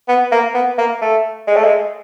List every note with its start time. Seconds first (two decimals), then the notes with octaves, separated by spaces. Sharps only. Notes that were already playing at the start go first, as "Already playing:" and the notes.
0.08 B3
0.32 A#3
0.54 B3
0.78 A#3
1.01 A3
1.47 G#3
1.56 A3
1.64 G#3